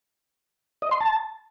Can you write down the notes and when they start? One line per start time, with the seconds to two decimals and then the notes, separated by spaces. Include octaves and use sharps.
0.82 D#5
0.91 C6
1.01 A5